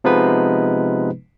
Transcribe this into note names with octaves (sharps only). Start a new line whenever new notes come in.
C3 F3 G#3 B3 D#4 B4